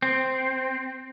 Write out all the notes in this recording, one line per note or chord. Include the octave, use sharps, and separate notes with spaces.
C4